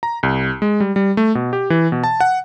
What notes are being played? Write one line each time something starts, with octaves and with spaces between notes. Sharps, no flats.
A#5
C2
G#3
G3
G3
A3
B2
G4
E3
B2
A5
F#5